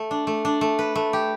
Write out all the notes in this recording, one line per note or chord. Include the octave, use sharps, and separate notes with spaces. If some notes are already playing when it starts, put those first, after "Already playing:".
Already playing: A3
D4
A3
D4
A3
B4
A3
G4